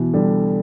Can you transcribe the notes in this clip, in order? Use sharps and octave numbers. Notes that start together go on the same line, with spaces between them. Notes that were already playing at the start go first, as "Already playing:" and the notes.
Already playing: B2 E3
D3 G3